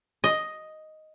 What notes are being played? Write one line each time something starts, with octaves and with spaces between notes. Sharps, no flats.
D#5